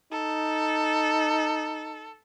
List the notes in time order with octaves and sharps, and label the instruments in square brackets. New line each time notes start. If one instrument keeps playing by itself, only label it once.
[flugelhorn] D#4 [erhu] A4